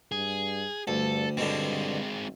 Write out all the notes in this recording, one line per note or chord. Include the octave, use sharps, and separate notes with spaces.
G2 G#4
D2 G2 A4
G2 B2 D3 G#3 C4
G#1